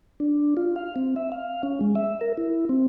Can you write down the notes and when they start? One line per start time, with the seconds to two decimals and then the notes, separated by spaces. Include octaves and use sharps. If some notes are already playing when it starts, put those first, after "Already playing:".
0.20 D4
0.57 F4
0.76 F5
0.96 C4
1.16 E5
1.32 F5
1.63 C#4
1.81 G#3
1.95 E5
2.21 A#4
2.37 E4
2.69 C4